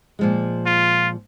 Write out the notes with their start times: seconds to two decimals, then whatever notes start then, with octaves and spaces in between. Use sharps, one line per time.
0.19 A#2 F3 G#3
0.66 F4